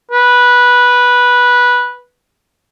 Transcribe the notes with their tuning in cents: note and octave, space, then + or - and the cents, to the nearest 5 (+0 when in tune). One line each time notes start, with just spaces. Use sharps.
B4 -10